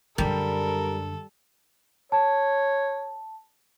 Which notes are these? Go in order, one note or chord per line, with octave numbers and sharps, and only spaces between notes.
F#2 D3 G3 A4 A#4
C#5 A5